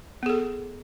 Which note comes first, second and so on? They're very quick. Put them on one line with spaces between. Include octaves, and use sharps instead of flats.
B3 G#4 A4